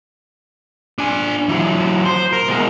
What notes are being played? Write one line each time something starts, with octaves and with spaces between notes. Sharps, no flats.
D4 G#5
E3 F#3
C5
A#4
B2 G#3